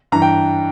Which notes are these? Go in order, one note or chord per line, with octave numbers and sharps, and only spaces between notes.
G2 E3 A#5
G5